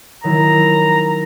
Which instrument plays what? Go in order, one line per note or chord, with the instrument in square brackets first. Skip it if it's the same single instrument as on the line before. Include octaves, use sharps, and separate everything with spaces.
[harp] D#3 F#3 E4 [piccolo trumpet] A#5